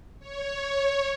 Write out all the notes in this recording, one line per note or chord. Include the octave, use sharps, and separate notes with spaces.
C#5